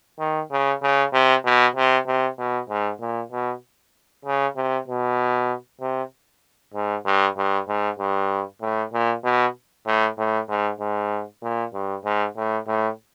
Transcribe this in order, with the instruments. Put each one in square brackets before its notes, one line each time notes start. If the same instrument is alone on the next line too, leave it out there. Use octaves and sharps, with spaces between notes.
[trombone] D#3
C#3
C#3
C3
B2
C3
C3
B2
G#2
A#2
B2
C#3
C3
B2
C3
G#2
G2
G2
G#2
G2
A2
A#2
B2
A2
A2
G#2
G#2
A#2
G2
G#2
A2
A2